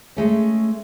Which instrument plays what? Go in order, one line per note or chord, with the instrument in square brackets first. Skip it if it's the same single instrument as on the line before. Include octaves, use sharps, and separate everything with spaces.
[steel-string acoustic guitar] G#3 A3 C#4